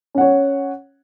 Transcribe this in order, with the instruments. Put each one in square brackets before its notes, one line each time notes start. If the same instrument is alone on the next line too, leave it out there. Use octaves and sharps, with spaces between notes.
[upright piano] C#4
F#5
C#5